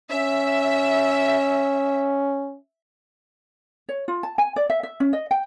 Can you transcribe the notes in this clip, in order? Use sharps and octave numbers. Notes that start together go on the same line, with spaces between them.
C#4 E5
C#5
F4
A5
G#5
D5
E5
E5
C#4
D#5
G5